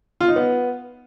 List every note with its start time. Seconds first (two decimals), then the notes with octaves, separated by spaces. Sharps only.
0.21 F4
0.28 D#4
0.36 B3